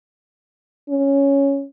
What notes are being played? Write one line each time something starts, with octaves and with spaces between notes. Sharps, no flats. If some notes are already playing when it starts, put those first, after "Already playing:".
C#4